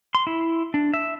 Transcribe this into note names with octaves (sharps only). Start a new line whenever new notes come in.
C6
E4
D4
E5